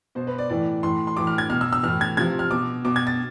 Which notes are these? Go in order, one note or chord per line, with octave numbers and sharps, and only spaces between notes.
B2 C5
B4
D5
A2 E3 D5
A2 E3 C6
C6
A2 E3 D6
F6
G#6
B2 F6
E6
E6
A2 E3 F6
G#6
C3 F3 G#6
F6
B2 D6
B2 D6
G#6
A6